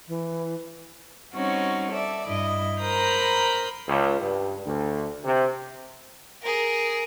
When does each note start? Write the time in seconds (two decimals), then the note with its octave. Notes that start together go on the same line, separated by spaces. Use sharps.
0.08 E3
1.34 G3 C4 C#4 D#4 F#4
1.93 A4 D5 E5
2.27 G2 E4 D#5
2.80 A#4 C5 A#5 B5 D#6 G6
3.87 C#2
4.20 G2
4.65 D2
5.24 C3
6.42 G#4 A#4